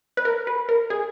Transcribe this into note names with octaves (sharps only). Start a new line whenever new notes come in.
B4
A#4
B4
A#4
G#4